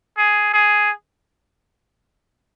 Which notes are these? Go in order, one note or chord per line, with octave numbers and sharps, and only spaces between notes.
G#4
G#4